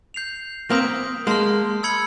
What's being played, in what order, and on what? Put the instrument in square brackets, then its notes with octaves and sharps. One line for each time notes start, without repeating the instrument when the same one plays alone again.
[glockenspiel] G6 C7 F7
[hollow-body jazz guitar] A#3 C4 [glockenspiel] D#6 G6 B6 D7
[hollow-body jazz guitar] G#3 A#3 [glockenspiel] A5 C6 F6
[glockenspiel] B5 E6 G#6 C#7 F#7